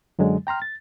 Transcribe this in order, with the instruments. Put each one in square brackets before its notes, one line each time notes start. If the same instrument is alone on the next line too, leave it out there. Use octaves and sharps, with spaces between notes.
[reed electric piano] F#2 D3 F#3 G#3
G5 A#5 C6 F6
A6